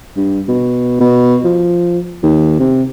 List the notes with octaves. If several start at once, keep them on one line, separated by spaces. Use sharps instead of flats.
G2
B2
B2
F3
D#2
C3